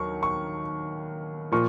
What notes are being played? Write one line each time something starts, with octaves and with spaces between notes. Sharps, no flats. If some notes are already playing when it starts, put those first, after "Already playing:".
Already playing: D#2 D#3 F#3 C#6
C#6
A#2 F3 C#6